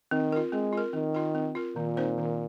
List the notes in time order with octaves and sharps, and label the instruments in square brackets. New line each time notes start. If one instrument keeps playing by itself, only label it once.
[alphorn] D#3 [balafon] C4
[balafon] F4 A#4
[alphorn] G#3 [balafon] C4
[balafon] F4 A#4
[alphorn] D#3 [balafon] C4
[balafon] F4 A#4
C4
F4 A#4
[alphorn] A#2 [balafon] D#3
[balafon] C4 D#4 C5
D#3